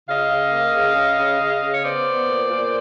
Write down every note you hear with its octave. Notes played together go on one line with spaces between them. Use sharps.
C#3 D#5 F5
C#3
A#3
C#3
C#3
C#3
C#3
C#3
C#5
B3 C5 D5
B3
A#2
A#2